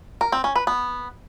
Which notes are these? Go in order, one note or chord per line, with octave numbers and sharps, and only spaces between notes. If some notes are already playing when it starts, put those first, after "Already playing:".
A#4
C4
C#4
B4
B3